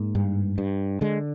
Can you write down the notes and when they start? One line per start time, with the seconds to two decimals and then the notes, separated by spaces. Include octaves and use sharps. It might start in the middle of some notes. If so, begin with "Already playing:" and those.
Already playing: G#2 A#3
0.15 G2
0.58 G2
1.01 D3 G#3